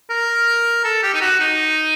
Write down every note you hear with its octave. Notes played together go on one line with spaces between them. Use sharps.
A#4
A4
G4
D#4
F#4
D#4